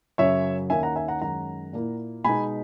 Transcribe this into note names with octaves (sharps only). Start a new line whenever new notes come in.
F#2 C#3 F#3 C#5 E5
D#2 D#3 A#3 C#4 E5 G#5
F#5 A#5
E5 G#5
F#5 A#5
F#2 D#3 G#3 C#4 F#5 A#5
A#2 A#3 E4
B2 G#3 B3 D#4 G#5 B5